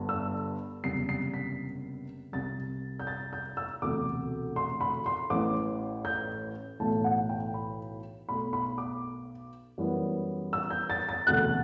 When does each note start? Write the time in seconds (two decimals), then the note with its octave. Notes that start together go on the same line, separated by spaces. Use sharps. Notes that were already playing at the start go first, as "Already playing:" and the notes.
Already playing: G1 G2 D3
0.09 E6
0.84 F#1 E2 C3 G3 C7
1.09 C7
1.34 B6
2.32 C2 C3 G3 A6
2.99 G6
3.07 A6
3.33 G6
3.57 E6
3.82 E1 D2 C3 D6
4.56 C6
4.81 B5
5.06 C6
5.30 A1 A2 E3 D6
6.05 G6
6.80 B1 A2 E3 A3 A5
7.04 F#5
7.29 G5
7.54 B5
8.29 B1 B2 A3 B5
8.53 B5
8.78 D6
9.78 F#2 E3 G3 B3
10.53 E6
10.70 G6
10.90 A6
11.09 A6
11.26 E1 D2 C3 F#6